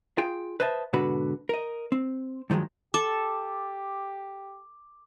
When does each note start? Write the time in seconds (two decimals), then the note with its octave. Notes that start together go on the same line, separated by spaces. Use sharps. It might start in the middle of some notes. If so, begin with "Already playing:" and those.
0.18 F4 G#4 G5
0.60 B4 C5 D#5 E5 A5
0.93 G#2 B2 D3 F#4 B4 B5
1.49 A#4 D#5
1.92 C4
2.50 G2 D#3 F3 F#3 G#3
2.94 G4 A4 D6